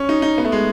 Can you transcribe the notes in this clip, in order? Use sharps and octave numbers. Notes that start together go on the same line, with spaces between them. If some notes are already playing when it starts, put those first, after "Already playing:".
Already playing: C#4
D#4
D#4
B3
A3
G#3